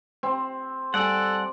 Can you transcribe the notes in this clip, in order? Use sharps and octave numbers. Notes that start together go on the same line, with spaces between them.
C4
G3 A4 D5 F#5 G#5